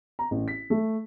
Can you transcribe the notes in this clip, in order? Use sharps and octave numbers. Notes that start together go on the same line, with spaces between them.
A#5
A1
B6
A3